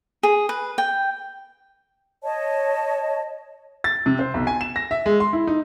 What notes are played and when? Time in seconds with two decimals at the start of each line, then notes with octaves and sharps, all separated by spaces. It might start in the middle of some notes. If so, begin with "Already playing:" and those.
0.23 G#4
0.49 B4
0.78 G5
2.24 C#5 D#5 A5
3.84 A6
4.06 C3
4.19 C5
4.34 B1
4.47 G#5
4.61 E7
4.76 A#6
4.91 E5
5.06 G#3
5.20 C6
5.33 E4
5.47 D#4